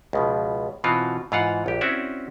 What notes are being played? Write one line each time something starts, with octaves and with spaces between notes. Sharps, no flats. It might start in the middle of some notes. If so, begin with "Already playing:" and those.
C#2 B2 F3
B2 E3 C4 F4 F#4
G#2 E3 F4 F5 F#5
A#1 G4
C4 C#4 E4 F#4 D5 E5